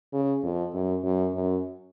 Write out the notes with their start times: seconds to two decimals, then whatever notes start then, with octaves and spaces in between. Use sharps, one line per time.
0.13 C#3
0.43 F2
0.74 F#2
1.04 F#2
1.35 F#2